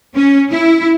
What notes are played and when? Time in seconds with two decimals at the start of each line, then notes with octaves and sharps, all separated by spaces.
0.15 C#4
0.50 E4